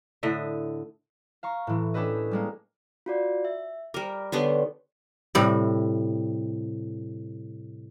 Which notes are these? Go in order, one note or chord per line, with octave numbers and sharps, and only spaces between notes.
A2 D3 D#5 E5
F5 A#5 C#6
A2 E3
C#4 D4 G4 A4 B4 D#5
G3 G#3 A#3
F4 F#4 D5
E5
G3 A#4 D6
D3 B3 D4 D#4 G4 C#5
A2 C3 G3